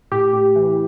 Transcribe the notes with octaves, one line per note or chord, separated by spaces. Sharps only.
A2 G4
A2
E3